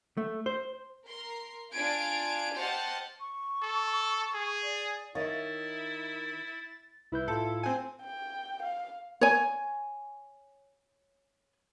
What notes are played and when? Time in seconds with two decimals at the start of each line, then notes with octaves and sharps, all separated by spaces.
0.17 A3
0.46 C5
1.05 A#4 C6
1.71 D4 F4 F5 G#5 G#6 D7
2.55 G4 C5 D#5 F#5 A5 F6
3.20 C#6
3.62 A4
4.34 G#4
4.63 D5
5.15 D#3 E4 C#5 D#5 E5 A6
7.12 C2 E4 B4 G6
7.28 A2 F4 A4
7.63 C4 G#5
8.02 G5
8.63 F5
9.21 C#5 G#5